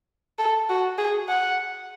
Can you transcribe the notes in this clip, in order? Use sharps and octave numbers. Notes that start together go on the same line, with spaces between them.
A4
F#4
G#4
F#5